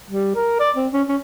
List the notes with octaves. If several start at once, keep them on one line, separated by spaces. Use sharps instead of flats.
G3
A#4
D5
C4
C#4
C#4